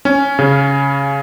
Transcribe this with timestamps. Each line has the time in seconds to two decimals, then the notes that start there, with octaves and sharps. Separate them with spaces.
0.05 C#4
0.39 C#3